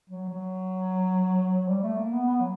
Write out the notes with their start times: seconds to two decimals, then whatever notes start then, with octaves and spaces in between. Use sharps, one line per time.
0.10 F#3
0.30 F#3
1.68 G3
1.83 A3
1.97 A#3
2.12 B3
2.27 B3
2.40 F#3